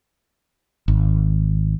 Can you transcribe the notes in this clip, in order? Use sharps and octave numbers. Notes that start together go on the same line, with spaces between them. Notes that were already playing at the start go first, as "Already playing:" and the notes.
G#1